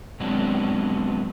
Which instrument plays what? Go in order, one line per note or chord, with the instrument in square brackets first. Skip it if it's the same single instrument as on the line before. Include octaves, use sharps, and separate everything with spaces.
[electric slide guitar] B2 F#3 G#3 B3 C4 D4